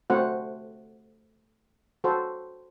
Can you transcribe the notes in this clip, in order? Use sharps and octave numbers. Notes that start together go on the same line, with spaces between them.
A3 C4 F#4 C5 F#5
F#4 A4 C5